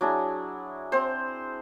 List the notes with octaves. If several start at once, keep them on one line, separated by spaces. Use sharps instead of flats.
F#3 D4 E4 G#4
C4 C5